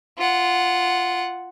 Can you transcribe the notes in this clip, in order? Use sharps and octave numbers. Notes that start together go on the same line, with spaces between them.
F4 F#5